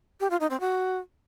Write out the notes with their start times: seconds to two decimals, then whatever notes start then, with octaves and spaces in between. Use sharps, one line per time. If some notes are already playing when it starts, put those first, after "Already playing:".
0.20 G4
0.30 F4
0.40 D#4
0.50 C4
0.60 F#4